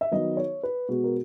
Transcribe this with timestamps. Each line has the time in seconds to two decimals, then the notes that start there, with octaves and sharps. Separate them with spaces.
0.01 E5
0.11 D#3 F#3 B3 D#5
0.37 C#5
0.63 B4
0.89 B2 G#3 B3 F#4
1.04 A#4